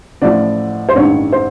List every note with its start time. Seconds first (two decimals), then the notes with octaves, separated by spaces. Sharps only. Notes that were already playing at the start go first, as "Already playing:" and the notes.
0.22 A1 A2 F3 D5
0.89 C5
0.95 A1 G2 D#3 C#5
1.32 C5